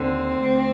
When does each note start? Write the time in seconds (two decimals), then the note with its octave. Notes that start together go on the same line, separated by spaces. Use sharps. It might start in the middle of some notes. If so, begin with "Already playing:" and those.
Already playing: D#2 D3 C4
0.43 D2